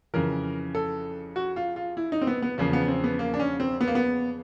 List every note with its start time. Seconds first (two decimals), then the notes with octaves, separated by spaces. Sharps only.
0.14 F2 C#3 E3 A#4
0.75 A4
1.36 F#4
1.56 F4
1.76 F4
1.97 E4
2.12 D#4
2.21 C4
2.27 B3
2.42 B3
2.58 E2 C#3 F3 A#3
2.73 B3
2.88 C4
3.04 B3
3.19 A#3
3.34 D4
3.39 C#4
3.60 C4
3.81 B3
3.88 A#3
3.95 B3